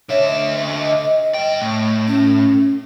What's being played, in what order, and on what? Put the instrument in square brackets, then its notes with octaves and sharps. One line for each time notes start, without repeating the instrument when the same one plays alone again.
[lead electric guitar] D3 E5 [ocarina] C#5
[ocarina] D#5
[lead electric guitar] G2 G5
A2
[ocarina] C#4